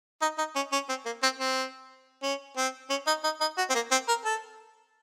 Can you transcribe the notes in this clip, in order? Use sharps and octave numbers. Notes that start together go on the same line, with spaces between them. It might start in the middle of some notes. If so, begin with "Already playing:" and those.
D#4
D#4
C#4
C#4
C4
A#3
C4
C4
C#4
C4
C#4
D#4
D#4
D#4
F#4
C4
A#3
C4
A#4
A4